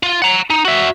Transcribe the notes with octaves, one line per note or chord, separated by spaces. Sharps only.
F4
F#5 A#5
D#4
F#4 E5